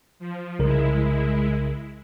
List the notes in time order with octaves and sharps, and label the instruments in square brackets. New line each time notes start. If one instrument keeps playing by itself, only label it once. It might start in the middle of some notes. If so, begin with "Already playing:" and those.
[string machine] F3
[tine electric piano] C2 C#3 A#4 [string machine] G#3 E4